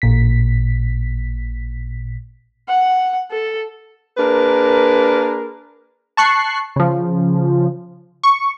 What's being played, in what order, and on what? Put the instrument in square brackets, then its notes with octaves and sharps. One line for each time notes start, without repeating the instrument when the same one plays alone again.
[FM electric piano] A1 A#2 B6
[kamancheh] F#5
A4
[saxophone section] A#3 D4 G#4 A#4 B4
[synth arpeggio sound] A5 C#6 F#6 C7
C#3 F3
C#6